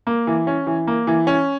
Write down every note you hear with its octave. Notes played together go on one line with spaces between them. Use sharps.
A#3
E3
C#4
E3
A#3
E3
C#4